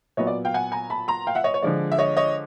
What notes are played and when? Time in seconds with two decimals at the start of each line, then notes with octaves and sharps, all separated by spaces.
0.17 A#2 F#3 B3 C#5 D#5
0.27 D5
0.45 F5 G5
0.54 F#5 G#5
0.72 G#5 A#5
0.90 A5 B5
1.08 A#5 C6
1.27 F5 G5
1.35 E5 F#5
1.44 C#5 D#5
1.54 C#5
1.62 D3 F3 G#3 D5
1.92 E5
1.98 C#5 D#5
2.17 C#5 D#5